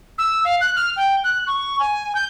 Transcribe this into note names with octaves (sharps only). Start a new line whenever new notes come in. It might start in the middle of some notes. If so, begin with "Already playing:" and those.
E6
F5
F#6
F6
G5
F#6
C#6
G#5
G6